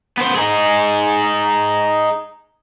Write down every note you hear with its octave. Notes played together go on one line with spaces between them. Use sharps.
B3 C5
D#4 G#4